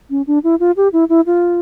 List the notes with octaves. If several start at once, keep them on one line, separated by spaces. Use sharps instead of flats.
C#4
D4
E4
F4
G4
E4
E4
F4